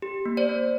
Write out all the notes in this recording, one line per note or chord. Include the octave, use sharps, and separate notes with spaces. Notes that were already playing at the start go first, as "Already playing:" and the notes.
G4
A#3
C5 D5
A#3